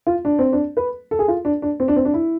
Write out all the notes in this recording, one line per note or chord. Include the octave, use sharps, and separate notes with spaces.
F4
D4
C4
D4
B4
A4
G#4
F4
D4
D4
C4
D4
C4
D4
E4